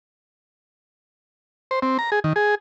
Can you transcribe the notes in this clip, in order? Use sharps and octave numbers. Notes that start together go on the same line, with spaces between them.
C5
C4
A#5
G#4
D#3
G#4